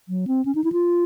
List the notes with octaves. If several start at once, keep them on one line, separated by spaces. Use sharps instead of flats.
F#3
C4
C#4
D#4
E4
F4